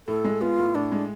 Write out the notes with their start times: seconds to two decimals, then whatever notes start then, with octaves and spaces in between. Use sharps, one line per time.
0.08 A2 A4
0.24 G#3
0.41 B3 F4
0.58 A2
0.75 A2 D4
0.92 G#3